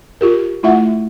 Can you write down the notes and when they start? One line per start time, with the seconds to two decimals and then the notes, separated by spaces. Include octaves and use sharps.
0.21 F4 G4 A#4
0.63 A3 E4 F4 E5 F#5